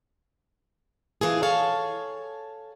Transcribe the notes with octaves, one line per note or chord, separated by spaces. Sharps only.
C3 E3 F4 G#4
G#4 A4 C#5 F5 A5